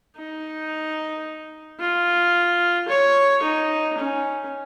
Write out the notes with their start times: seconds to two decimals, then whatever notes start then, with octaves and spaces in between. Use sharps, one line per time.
0.17 D#4
1.80 F4
2.89 C#5
3.43 D#4
3.98 C#4